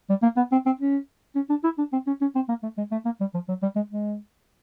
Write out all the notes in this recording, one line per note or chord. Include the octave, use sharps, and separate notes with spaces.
G3
A#3
B3
C4
C4
C#4
C#4
D4
E4
D4
C4
C#4
C#4
C4
A#3
A3
G#3
A3
A#3
G3
F3
F#3
G3
G#3
G#3